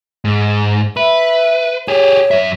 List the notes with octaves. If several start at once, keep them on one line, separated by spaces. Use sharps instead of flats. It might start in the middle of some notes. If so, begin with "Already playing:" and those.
G#2
B4 E5
G4 G#4 C#5
F#2 E5